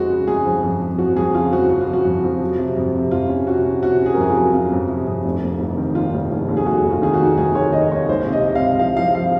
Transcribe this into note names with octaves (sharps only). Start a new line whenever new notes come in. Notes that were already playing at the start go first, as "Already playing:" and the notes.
Already playing: F2 F3 G#3 F#4
C#3
G#3 G#4
F3
F2
F2
F3 F#4
F2 G#4
C#3 F4
F3 F#4
C#3 F#4
F4
F3
F#4
F2
F3
F#3
C3
F2
C3
F2 F4
C#4
C3 F#4
C#4
C3 F#4
C#4 G#4
A#4
F2 G#4
F4
F#3
C#4 F4
F2
C3
F2
F1
A#3
F1
D#3
D#2 F4
F1
F1
D#2
G#4
D#2 F#4
F1
F4
D#3 G#4
F#4
A#3
F1 G#4
D#3 C#5
D#2 D#5
D#2 C#5
C#2 C5
C3
D#5
C3
F5
C#2
F3 F5
F3 F5
F3 F5